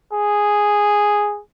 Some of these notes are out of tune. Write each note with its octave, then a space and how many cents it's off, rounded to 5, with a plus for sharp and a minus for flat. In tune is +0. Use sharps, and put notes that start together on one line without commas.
G#4 -5